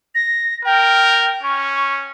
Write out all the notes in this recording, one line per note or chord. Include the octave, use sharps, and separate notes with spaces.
A#6
A#4 G5
C#4 C#6